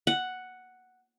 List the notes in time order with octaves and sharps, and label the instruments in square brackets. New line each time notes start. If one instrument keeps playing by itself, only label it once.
[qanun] F#5